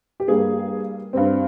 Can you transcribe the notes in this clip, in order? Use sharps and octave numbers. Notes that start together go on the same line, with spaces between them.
G4
G2 G3 A#3 G#4
G2 G3 C4